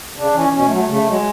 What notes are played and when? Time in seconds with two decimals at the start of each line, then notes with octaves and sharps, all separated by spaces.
0.17 C#3 D4
0.34 E3 C#4
0.53 B2 C#4
0.65 A3
0.70 F#3
0.76 A3
0.89 C#3 A3
1.07 F#3 G#3